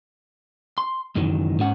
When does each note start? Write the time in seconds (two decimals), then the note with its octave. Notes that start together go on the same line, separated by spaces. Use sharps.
0.78 C6
1.16 C#2 F#2 D#3 E3 F#3
1.59 G#2 C#4 F#5